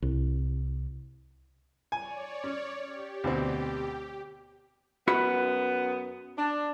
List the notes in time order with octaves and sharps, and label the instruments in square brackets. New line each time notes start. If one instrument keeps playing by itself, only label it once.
[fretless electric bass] C2
[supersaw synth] C#5 D5 [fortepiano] G#5
[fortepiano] C#4
[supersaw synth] G4
[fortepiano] D2 B2 C4
[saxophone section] F#2 B3 [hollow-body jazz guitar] F#4 E5 B5
[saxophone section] D4